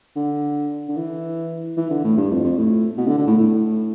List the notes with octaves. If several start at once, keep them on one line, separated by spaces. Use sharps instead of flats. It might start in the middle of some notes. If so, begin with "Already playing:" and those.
D3
D3
E3
E3
D3
A2
G2
F2
F2
A2
B2
D3
D3
A2
A2